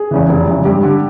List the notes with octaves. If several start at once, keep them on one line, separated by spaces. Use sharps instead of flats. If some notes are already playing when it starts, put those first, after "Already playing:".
Already playing: G#4
E2 C#3 E3
F1
F2 C#3 E3
G2 G4
D3 G3